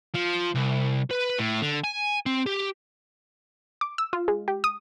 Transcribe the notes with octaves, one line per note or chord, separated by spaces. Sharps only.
F3
C2
B4
A2
D3
G#5
C4
G4
D6
E6
F4
G#3
G4
D#6